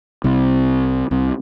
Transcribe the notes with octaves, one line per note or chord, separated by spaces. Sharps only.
C2 C3
C2 C3